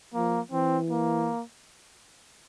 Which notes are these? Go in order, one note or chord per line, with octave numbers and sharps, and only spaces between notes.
F3 A#3
E3 C4
A#3